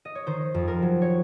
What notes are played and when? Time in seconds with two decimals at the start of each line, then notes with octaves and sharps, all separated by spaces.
0.05 D#5
0.15 C#5
0.27 D#3 C5
0.54 F2
0.68 A#4
0.82 F#3
1.02 C#5